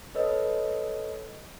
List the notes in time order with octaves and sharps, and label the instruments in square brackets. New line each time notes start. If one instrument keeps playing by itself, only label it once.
[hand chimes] A4 B4 C#5 D#5 E6